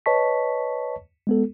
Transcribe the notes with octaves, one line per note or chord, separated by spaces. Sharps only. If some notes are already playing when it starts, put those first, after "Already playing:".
B4 C#5 D#5 A5 C#6 B6
G#3 B3 A4